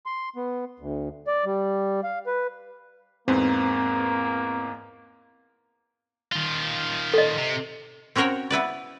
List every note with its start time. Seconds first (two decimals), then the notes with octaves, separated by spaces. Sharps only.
0.06 C6
0.36 B3
0.79 D2
1.27 D5
1.45 G3
2.03 F5
2.27 B4
3.28 E2 G#2 A#3 C4 B4
6.32 D#3 F4
7.14 A4 D#5
7.38 C3
8.16 C4 C#4 F#4 A#4 C5 C#5
8.50 B3 E4 B4 D5